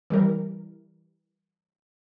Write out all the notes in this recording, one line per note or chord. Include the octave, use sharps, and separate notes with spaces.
E3 G3 A#4